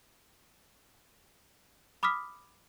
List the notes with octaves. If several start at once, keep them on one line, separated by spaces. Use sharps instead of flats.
B5 D6 D#6 F6 B6